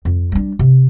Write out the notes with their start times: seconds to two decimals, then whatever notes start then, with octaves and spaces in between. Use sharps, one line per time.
0.05 F2
0.32 G3 D4
0.59 C3